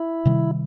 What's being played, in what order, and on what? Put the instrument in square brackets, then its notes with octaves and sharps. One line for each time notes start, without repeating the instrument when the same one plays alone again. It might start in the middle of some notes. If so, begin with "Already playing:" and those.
Already playing: [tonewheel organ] E4
[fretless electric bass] C3 D#3 G3